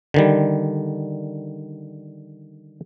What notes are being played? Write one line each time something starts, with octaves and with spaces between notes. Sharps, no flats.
D3 D#3 G3